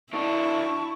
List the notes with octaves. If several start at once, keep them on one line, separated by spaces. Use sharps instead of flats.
E3 D4 E4 A5 C#6